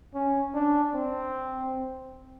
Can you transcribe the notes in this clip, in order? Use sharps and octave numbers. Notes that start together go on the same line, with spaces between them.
C#4
D4
C4